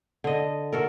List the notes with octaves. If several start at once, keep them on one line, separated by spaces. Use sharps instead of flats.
D3 D#5
F#4 A4 A#4